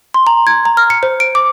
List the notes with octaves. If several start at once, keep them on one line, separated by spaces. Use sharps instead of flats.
C6
A#5
G#6
A#5
F6
C#7
C5
D7
D6